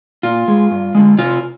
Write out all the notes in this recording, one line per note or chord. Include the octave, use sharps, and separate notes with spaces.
A#2 F4
G#3
G2
D3 G#3
C3 F4